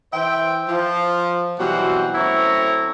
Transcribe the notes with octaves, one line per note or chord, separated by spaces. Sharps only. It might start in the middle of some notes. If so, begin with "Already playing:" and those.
E3 C5 E5 G5
F3
B2 E3 F#3 G3 C4 F#5
F#2 A3 C4 E4 C#5 A#5